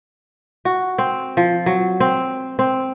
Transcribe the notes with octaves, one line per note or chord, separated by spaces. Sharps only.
F#4
C4
F3
F#3
C4
C4